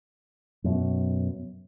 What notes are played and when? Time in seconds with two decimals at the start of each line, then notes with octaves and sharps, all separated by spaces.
0.64 F#2 B2